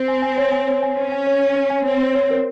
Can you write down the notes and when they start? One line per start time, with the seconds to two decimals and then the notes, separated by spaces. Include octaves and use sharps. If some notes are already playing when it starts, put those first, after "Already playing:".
Already playing: C4
0.08 G#5
0.22 G#5
0.38 C#5
0.52 G#5
0.68 C#5
0.83 G#5
0.97 C#4 C#5
1.12 G#5
1.27 C#5
1.41 C#5
1.56 C#5
1.70 G#5
1.86 C4 C#5
2.01 C#5
2.15 C#5
2.30 A#4